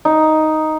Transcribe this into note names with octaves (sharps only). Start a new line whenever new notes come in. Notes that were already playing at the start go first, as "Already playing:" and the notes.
D#4